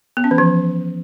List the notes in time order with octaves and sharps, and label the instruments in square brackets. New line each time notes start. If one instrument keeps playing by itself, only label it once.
[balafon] B3
C#4
E3
F3